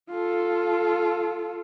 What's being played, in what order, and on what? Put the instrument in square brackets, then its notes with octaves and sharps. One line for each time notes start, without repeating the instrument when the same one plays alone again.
[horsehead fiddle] F4 A4